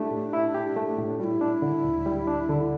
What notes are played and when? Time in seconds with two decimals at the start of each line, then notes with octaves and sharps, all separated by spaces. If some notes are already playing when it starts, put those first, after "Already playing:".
Already playing: A3 D4 E4 G4
0.11 A2
0.33 E4
0.54 G4
0.76 A3
0.98 A2
1.19 G3 E4 F#4
1.41 D4
1.62 D3
1.85 D2
2.06 G3
2.27 D4
2.49 D3